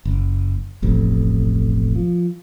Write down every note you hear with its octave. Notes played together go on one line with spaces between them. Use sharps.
F#1
E1 A1 F2
F3